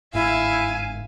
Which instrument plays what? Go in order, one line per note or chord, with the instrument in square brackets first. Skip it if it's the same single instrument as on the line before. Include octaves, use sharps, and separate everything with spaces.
[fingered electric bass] G1 G#2 [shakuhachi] E4 [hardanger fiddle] E5 F5 [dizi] G#5